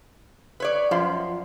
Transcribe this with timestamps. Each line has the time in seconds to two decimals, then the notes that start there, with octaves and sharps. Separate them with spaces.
0.60 B4 C#5 D5
0.91 F#2 F3 F4 C6